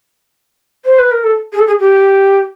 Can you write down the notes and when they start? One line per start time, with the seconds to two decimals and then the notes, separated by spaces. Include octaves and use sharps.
0.85 C5
0.99 B4
1.11 A#4
1.23 A4
1.53 G#4
1.59 A4
1.67 G#4
1.80 G4